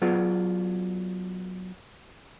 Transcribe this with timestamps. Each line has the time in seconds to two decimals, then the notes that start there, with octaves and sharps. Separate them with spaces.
0.02 F#3 B3 F4 G#4 D5